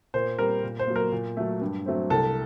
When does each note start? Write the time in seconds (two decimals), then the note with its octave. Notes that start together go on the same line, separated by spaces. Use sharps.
0.14 A#2 C5
0.38 G3 C4 A#4
0.63 A#2
0.79 C5
0.87 F#3 A#3
0.96 A#4
1.12 A#2
1.37 F#3 A3
1.61 G2
1.86 F#3 A3 C4
2.10 C2 A4